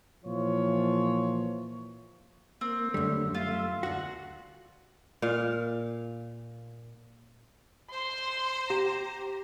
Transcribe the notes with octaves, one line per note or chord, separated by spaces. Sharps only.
A#2 E3 F3 F4 C#5
A#3 C4
F#2 D3 G3 A3
A3 F4 E5
D2 F#4 F#6
A#2 F5
C5 C6
G4 A#5